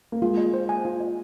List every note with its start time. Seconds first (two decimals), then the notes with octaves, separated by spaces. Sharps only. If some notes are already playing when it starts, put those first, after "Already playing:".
0.12 A#3
0.22 G#3 F4
0.37 D#5
0.54 C5
0.69 G#5
0.85 F4
1.00 D#5